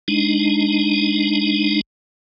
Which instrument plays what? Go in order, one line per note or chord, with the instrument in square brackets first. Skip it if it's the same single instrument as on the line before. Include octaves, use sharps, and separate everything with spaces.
[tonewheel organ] G#3 D4 D#4